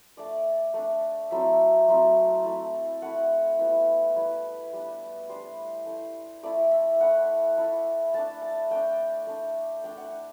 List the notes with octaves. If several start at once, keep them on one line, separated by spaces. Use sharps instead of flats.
A3 D4 D5
A3 D4
F#3 A3 C4 E4 E5
F#3 A3 C4 E4
A3 E4
A3 E4 F#5
G3 B3 E4
G3 B3 E4 B4
G3 D4
G3 D4 C5
A3 E4
A3 E4 D5
E5
A3 E4 F#5
A3 E4
A3 D4 A5
A5
A3 D4 G5
A3 D4
A3 D4 G5
F#5
G5